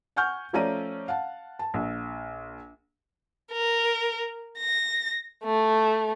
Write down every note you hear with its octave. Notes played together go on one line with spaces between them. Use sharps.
F#5 G#5 C#6 F6 G6
F3 A3 C#4 D5 A#5 D#7
F5 F#5 A5
A5
A#1
A#4
A#6
A3